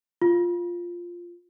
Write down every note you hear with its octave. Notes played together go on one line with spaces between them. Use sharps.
F4